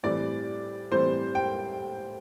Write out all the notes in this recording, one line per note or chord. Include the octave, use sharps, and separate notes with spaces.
A2 E3 G3 C4 D5
A2 E3 G3 C4 C5
G5